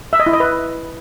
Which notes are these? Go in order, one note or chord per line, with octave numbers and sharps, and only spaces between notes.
E5
D#5
E4
D#5
B4